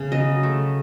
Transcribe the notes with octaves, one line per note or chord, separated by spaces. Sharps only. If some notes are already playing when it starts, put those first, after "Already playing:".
Already playing: C#3 A3
F#3 D#5
A3